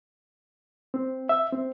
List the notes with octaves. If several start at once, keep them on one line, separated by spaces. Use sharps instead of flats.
C4
E5
C4